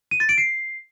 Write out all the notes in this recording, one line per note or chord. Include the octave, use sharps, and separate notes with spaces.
D#7
A6
D7
C7